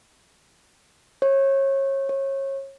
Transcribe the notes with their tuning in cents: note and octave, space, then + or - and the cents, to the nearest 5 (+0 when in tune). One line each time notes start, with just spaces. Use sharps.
C#5 -30
C#5 -30